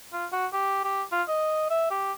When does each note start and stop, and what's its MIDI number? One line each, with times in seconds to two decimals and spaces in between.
0.13 0.26 65
0.32 0.47 66
0.53 0.79 67
0.84 1.03 67
1.12 1.23 65
1.28 1.66 75
1.70 1.89 76
1.90 2.13 67